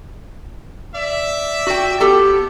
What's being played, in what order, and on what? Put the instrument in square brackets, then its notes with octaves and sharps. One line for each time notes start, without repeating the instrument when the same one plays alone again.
[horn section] D5 E5
[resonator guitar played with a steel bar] F#4 G5
B3 G4 A4